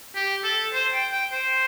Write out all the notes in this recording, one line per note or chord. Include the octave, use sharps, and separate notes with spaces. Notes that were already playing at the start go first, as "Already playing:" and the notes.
G4
A4
C5
G5
G5
C5